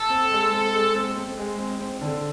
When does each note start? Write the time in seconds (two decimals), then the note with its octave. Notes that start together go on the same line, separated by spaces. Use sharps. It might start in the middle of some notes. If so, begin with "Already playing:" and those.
Already playing: A4
0.10 C4
0.32 G#3
0.52 C4
0.74 G#3
0.95 C4
1.17 C4
1.38 G#3
1.59 C4
1.80 C4
2.01 D3